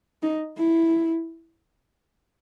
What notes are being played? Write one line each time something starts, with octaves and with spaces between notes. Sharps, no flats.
D#4
E4